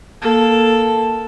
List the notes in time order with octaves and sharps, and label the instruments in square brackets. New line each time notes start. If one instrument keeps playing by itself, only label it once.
[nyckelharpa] A#3 A4